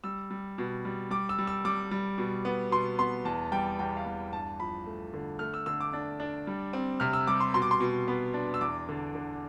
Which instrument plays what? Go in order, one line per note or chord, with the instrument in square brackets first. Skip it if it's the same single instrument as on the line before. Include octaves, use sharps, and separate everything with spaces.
[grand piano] G3 E6
G3
B2
G3
G3 D6
E6
G3
E6
G3 D6
G3
B2
B3
B2 C6
B3 C6
E2 A5
G3 G5
E2 G5
F5
E2
G2 A5
F3 B5
A3
D3
A3 F6
E6
D3 E6
D6
D4
D4
G3
C4
C3 F6
E6
G3 D6
C6
B2 C6
D6
C6
B2
B3
D4
E6
E2 D6
D3
D3